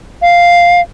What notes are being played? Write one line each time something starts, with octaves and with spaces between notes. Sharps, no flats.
F5